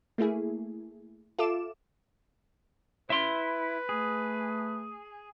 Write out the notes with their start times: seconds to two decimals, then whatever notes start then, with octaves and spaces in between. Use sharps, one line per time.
0.18 A3 A#3 E4 G#4
1.39 F4 A4 E5 D6 E7
3.10 E4 B4 E5 C6
3.89 A3 G#4